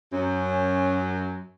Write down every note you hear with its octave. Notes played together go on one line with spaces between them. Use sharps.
F#2 C#4